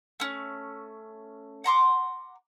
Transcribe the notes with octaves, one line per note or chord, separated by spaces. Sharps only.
A3 C#4
F#5 A#5 C6 D6